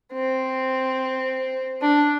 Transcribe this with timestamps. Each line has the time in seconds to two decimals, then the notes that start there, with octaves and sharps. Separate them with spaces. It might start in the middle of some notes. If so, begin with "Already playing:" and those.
0.12 C4
1.81 D4